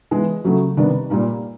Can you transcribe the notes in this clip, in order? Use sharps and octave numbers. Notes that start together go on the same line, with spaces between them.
E3 G#3 B3
C#3 F#3 A3
C3 D#3 G3 B3 D4
A#2 G3 A#3 D#4